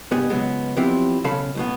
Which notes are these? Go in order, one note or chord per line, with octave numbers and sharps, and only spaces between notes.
C2 G2 B3 G4 G#4 D#5
C#2 F#3 G#3 B3
F3 F#3 B3 C4 E4 G4
B1 C#3 A4 C#5 F5 B5
B1 A2 B3